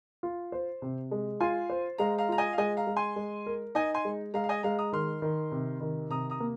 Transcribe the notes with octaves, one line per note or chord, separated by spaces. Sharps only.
F4
C5
C3
G#3
F4 G#5 C6
C5
G#3 F5 A#5
F5 A#5
F4 A#5
D#5 G#5
F5
G#3 D#5 G#5
F5 A#5
G#3
G#5 C6
G#3
A#4
D#4 D#5 G#5
G#5 C6
G#3
G#3 F5 A#5
F5
D#5 G#5
G#3 F5 A#5
A#5 D#6
D#3 C6 F6
D#3
C3
D#3
C3 A#5 D#6
A#5 D#6
A#3